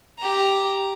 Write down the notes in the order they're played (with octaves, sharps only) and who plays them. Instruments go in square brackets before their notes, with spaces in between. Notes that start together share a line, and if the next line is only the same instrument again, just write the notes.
[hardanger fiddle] G4 A#5